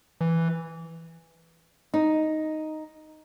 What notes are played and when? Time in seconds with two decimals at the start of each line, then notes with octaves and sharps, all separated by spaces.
0.21 E3
1.94 D#4